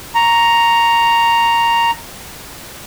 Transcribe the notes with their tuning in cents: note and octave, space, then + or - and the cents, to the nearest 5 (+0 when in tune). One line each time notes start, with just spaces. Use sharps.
A#5 +0 C#6 +0